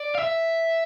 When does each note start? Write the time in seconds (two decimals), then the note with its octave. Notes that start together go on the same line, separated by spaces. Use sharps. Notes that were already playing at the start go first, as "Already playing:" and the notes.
Already playing: D5
0.15 F5
0.19 E5